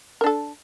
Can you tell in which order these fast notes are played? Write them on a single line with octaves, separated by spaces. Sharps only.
A#4 D4 A4